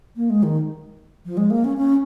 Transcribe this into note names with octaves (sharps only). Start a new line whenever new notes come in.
A#3
G#3
D#3
F3
G#3
A#3
C#4
C#4